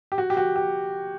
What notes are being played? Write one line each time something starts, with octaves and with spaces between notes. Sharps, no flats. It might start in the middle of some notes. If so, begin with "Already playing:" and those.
G4
F#4
G4
F#4
G4